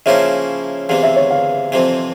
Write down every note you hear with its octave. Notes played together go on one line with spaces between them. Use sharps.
C#3 F3 A#3 C#4 E4 E5
E2 C3 E3 F5
E5
C#5
F5
F2 C3 E3